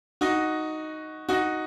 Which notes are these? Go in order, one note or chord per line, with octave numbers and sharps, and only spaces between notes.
D#4 F#4
D#4 F#4